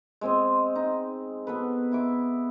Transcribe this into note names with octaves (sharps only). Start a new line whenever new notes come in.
G#3 C4 D#5
D#4
B3 A4 B4
E4 E5 D6